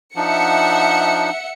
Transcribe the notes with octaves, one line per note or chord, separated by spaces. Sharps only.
F3 D4 D#4 E5 F#5 C#7